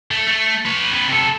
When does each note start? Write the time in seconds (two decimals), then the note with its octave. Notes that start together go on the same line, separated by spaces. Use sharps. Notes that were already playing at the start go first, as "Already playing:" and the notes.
0.11 A3
0.27 A3
0.65 B4 C#5
0.93 C4 B4
1.08 C3 A4